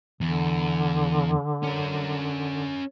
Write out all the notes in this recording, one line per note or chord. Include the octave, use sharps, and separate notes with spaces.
E2 D3
C#4 A#4